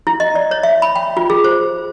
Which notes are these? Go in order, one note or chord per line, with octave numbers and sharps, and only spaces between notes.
E4
D#5
D5
C#5
E5
B5
G5
F4
G#4
C5